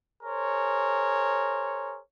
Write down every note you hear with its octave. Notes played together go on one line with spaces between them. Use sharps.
G#4 A#4 C5 C#5